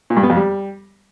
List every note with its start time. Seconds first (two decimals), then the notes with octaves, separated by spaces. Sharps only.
0.10 A#2
0.17 G2
0.23 B3
0.30 F2
0.36 G3